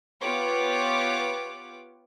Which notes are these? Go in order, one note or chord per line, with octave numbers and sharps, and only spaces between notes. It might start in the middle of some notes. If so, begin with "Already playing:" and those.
B3 F4 G4 B4 C#5 D6